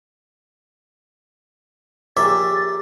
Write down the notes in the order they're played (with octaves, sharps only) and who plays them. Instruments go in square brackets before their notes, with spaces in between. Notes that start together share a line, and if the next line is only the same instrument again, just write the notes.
[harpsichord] A#1 C#5 E5 [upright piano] G4 G#4 A#5 [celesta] D6 [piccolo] A6